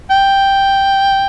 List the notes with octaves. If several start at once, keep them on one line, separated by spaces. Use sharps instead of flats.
G5